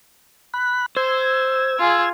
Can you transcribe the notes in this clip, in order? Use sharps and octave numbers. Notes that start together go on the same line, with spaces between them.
B5 F#6
C5 E6 G#6
F4 G#4